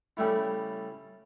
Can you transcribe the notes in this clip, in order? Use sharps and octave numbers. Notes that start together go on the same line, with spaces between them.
C#3 G3 A3 E4